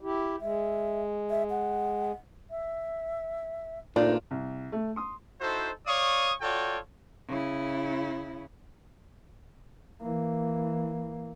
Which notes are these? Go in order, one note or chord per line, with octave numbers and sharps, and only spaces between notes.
E4 G4
G#3 E5
E5
F#5
E5
D2 G2 A#2 D4 D#4 F4
C2
A3
C6 D#6
D#4 E4 F#4 A4 C5
C#5 D5 F5 C#6 D#6
F4 F#4 A4 C#5 D5 G5
C#3 E4
E3 A#3